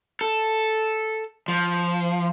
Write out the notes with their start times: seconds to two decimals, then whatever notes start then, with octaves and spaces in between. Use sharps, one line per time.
0.21 A4
1.48 F3